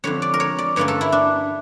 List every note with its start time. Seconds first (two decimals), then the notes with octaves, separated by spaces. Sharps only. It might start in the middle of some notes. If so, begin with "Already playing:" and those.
0.04 F2 D3 G3 C#5
0.22 D5
0.34 A#4
0.40 C#5
0.58 D5
0.76 G2 D3 G3 A#3 C#4 C#5
0.88 A4
1.01 E4
1.12 D4